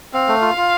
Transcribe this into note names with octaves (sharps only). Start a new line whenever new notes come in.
C4 F5
A3
F4
F4